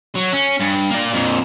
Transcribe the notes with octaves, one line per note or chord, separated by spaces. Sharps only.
F#3
C#4
G2
A#3 D5
F2 A#2